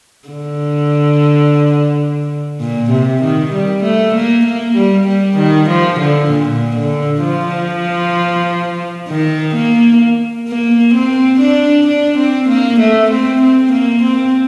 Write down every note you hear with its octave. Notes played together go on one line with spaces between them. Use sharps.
D3
A#2
C3
D#3
G3
A3
A#3
A#3
G3
G3
D#3
F3
D3
A#2
D3
F3
D#3
A#3
A#3
C4
D4
D4
C4
A#3
A3
C4
C4
A#3
C4